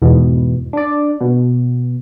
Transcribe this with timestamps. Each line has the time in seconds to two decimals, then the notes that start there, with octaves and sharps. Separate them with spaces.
0.02 E2 G#2 B2 E3
0.73 D4 D5
1.21 B2